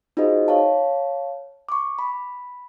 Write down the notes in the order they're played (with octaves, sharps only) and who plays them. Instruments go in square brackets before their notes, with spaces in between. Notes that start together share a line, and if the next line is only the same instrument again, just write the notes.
[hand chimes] D#4 F4 F#4 G#4 C5 D#5
C#5 F5 A5
C#6 D6
B5